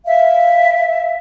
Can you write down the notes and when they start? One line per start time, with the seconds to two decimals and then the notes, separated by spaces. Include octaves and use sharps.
0.06 E5 F5